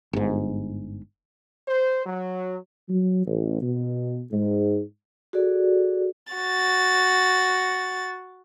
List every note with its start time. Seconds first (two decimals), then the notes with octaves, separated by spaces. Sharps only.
0.13 G1 G#2
1.67 C5
2.06 F#3
2.89 F#3
3.26 A1
3.61 B2
4.31 G#2
5.33 F#4 G#4 A4 D5
6.33 F#4 A6